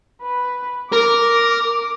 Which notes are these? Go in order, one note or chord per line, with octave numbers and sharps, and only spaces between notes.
B4
A#4 D6